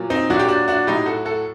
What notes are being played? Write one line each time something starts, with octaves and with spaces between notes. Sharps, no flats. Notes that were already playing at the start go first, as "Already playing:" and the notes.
Already playing: A#2 F#3
C4 D#4
A#2 F#3 D4 F#4
G4
D4 F#4
D4 F#4
A2 F#3 D#4 G4
F#4 A4
F#4 A4